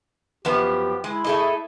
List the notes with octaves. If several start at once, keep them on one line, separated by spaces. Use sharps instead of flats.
F#2 F3 B3 G4
G#3 E4
A3 G#4 D#5